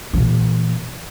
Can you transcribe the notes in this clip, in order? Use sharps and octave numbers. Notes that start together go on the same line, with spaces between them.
A#2 E3